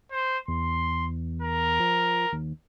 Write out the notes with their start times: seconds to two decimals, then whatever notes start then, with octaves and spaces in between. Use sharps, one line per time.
0.12 C5
0.48 E2 C6
1.42 A#4
1.80 F3
2.32 D#2